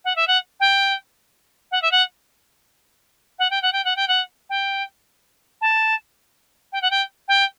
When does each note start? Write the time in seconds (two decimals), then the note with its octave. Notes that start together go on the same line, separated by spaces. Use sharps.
0.04 F#5
0.15 E5
0.27 F#5
0.60 G5
1.71 F#5
1.82 E5
1.91 F#5
3.38 F#5
3.50 G5
3.62 F#5
3.72 G5
3.84 F#5
3.96 G5
4.08 F#5
4.49 G5
5.61 A5
6.72 G5
6.81 F#5
6.90 G5
7.28 G5